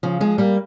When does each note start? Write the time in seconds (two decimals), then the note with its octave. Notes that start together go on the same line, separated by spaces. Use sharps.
0.03 C#3 F3
0.21 F3 G#3
0.38 G3 A#3